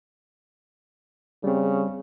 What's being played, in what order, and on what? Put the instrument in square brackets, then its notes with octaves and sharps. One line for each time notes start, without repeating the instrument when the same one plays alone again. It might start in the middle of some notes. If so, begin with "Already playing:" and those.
[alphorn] C#3 [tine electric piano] G3 C4